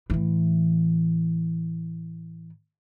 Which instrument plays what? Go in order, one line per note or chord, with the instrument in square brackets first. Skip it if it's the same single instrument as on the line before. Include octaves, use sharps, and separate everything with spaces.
[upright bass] A2 E3